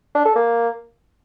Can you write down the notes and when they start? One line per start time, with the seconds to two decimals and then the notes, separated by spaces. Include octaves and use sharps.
0.15 D4
0.25 A4
0.36 A#3